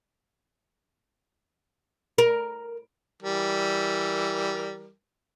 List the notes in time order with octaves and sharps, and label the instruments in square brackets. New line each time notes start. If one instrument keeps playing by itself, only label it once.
[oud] A#4
[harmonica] E3 G3 A#4